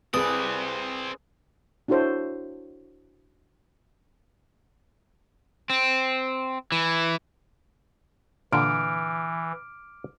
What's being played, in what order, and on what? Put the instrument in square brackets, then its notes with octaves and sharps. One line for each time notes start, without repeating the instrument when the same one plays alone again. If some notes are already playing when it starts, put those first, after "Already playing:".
[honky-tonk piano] C2 [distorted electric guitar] C4 D5 [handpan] G#4 B4 [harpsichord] D#6
[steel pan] D4 E4 F#4 A4 C5 C#5
[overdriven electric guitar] C4
E3
[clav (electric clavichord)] A#2 D3 [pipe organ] E3 [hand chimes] D6 F6 D7